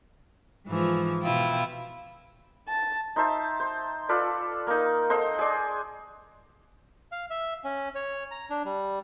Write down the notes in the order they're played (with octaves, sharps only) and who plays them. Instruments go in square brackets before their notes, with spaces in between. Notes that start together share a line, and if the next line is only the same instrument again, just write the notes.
[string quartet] G#2 E3 F3
B2 E4 F4 G5
[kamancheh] A5
[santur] D#4 C5 E5 A5
C5
F4 A4 B4 D5
A#3 D#4
A4 C5 D#5 F#5
G#4 D5
[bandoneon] F5
E5
C#4
C#5
A#5
D4
G3